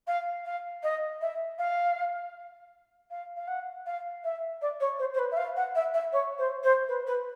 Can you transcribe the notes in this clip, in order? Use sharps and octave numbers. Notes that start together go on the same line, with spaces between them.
F5
F5
D#5
E5
F5
F5
F5
F#5
F5
E5
D5
C#5
C5
C5
B4
E5
F5
F#5
E5
E5
C#5
C5
C5
B4
B4